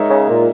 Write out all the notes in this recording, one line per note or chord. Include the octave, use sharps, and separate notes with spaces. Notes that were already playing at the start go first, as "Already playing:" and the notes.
Already playing: G#3 D#4 A#4 C#5 E5
C#3
A#2